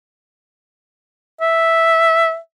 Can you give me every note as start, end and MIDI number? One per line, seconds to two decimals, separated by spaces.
1.41 2.37 76